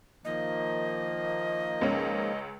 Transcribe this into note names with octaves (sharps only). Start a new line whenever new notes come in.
D#3 F3 A#3 D#5
C#2 C#4